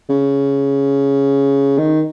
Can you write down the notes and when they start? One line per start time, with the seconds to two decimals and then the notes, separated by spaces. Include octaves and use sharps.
0.10 C#3
1.78 D#3